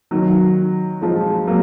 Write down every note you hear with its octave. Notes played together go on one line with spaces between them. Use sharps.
D#3 F#3
F3 G#3
F#3 A#3